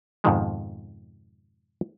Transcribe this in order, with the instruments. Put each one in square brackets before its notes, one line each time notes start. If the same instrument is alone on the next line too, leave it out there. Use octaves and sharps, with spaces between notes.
[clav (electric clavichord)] F2 G#2 B2 D#3 F3 G#3